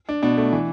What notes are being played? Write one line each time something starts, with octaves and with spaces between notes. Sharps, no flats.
D4
B2 D4
A3
E3